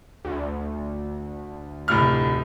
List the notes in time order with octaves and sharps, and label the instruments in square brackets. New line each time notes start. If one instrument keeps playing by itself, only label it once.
[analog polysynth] D2
[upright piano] F1 A2 F6